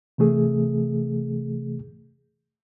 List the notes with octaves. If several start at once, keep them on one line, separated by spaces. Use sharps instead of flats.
C3 E3 A3 G#4